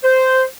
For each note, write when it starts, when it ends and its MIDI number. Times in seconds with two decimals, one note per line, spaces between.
0.03 0.44 72